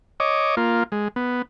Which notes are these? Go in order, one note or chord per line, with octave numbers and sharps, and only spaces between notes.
C#5 D#5 D6
A#3 F4
G#3
B3